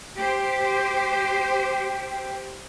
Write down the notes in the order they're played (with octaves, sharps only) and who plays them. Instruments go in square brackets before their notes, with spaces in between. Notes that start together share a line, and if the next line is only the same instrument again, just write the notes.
[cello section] G4 C5 [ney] G5